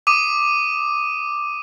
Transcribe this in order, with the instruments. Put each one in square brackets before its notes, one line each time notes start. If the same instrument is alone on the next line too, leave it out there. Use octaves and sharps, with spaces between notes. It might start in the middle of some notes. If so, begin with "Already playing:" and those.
[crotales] D6 D#6 D#7